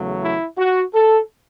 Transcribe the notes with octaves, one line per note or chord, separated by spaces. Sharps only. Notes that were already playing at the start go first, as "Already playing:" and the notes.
Already playing: E2 C#3 F#3 A3
E4
F#4
A4